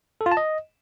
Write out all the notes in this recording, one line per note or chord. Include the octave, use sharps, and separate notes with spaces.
A4
F4
A5
D#5